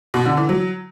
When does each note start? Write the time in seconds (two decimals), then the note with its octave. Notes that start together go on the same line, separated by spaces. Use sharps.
0.14 B2
0.26 D3
0.37 E3
0.49 F#3